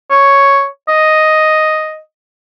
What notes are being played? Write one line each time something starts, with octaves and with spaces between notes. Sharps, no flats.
C#5
D#5